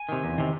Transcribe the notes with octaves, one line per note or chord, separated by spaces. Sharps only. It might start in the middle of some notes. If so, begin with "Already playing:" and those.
Already playing: G#5
C3 D#3
E2
C3 D#3